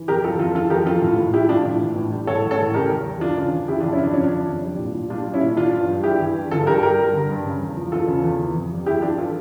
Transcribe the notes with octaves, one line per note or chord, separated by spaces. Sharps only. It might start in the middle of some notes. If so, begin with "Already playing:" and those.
Already playing: E3
F2 G4 A#4
G3 F4 A4
F2 F4 A4
E3 F4 A4
F2 G4 A#4
F3 F4 A4
A2
A2
F3 E4 G4
F3 D4 F4
A2
E3
A2
G3
A2 A4 C#5
E3
A4 C#5
A2
C#3 G4 A#4
E2
G3
E2 D4 F4
C#3
E2
C#3 E4 G4
D4 F4
F2
C#4 E4
F3 D4
F2 C#4
D4
C#3
F2
G3
A#2
A#2
G3 D4 F4
G3
C#4 E4
A#2
E3 D4 F4
G2
G3
G2 E4 G4
E3
G2
D3 F4 A4
G2 G4 A#4
G3 G4 A#4
G2
D3
G2
C#3
E2
F3
E2 F4 A4
C#3
E2
E3
F2
G3
F2 E4 G4
E3 D4 F4
F4 A4